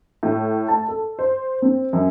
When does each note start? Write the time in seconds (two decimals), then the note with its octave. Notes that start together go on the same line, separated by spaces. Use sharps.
0.23 A2
0.68 A5
0.88 A4
1.19 C5
1.62 C4
1.93 F#2